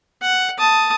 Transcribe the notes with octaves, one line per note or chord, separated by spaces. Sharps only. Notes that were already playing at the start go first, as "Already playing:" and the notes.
F#5
A5 D#6